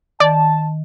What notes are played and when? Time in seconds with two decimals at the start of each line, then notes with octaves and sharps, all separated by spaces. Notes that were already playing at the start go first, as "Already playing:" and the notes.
0.20 D#3 D5 A5